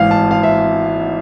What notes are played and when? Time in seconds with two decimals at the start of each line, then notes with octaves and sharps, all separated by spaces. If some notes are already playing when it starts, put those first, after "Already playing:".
Already playing: G#1 G#2 E3 F5
0.11 A5
0.31 F5
0.43 E5